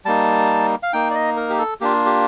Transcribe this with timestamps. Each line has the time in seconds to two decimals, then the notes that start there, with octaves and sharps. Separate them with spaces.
0.05 G3 A#3 D#4 A5
0.83 F5
0.93 A#3 D#4 G5
1.11 D5
1.15 D#5
1.37 A#4
1.50 G4
1.59 A4
1.81 A#3 D4 F4 G4
2.06 G4